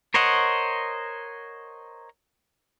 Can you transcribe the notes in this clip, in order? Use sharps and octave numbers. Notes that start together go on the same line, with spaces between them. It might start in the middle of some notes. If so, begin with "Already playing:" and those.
A#4 C5 C#5 D#5 F#5